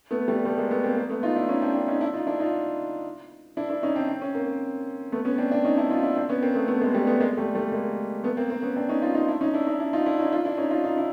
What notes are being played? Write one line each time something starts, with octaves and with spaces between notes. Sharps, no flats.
A3 B3
G3 A3
G3 A3
G#3 A#3
A3 B3
A#3 C4
A#3 C4
A3 B3
D#4 F4
D4 E4
C#4 D#4
C4 D4
C4 D4
C#4 D#4
D4 E4
D#4 F4
D4 E4
D#4 F4
D4 E4
D4 E4
C#4 D#4
C4 D4
C4
C#4
A#3 C4
A3 B3
B3 C#4
C4 D4
C4 D4
C#4 D#4
D4 E4
D#4 F4
D4 E4
C4 D4
B3 C#4
A#3 C4
A3 B3
A3 B3
G#3 A#3
G3 A3
A3 B3
G#3 A#3
G3 A3
G3 A3
G#3 A#3
A3 B3
A#3 C4
A#3 C4
B3 C#4
C4 D4
C#4 D#4
D#4 F4
D#4 F4
D4 E4
C#4 D#4
D4 E4
C#4 D#4
D4 E4
D#4 F4
D4 E4
C#4 D#4
D#4 F4
D4 E4
C#4 D#4
D#4 F4
D#4 F4
D4 E4